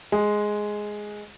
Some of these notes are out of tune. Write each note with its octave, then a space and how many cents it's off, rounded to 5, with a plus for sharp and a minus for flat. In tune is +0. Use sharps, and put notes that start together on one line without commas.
G#3 +5